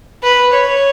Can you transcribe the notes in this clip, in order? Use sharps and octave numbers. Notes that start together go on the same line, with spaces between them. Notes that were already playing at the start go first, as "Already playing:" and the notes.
B4
C#5